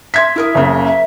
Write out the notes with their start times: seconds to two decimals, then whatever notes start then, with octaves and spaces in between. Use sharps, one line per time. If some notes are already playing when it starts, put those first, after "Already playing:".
0.14 E5 C6 G#6 B6
0.36 E4 A#4 D#6
0.55 F#1 C#3 A#3
0.85 E5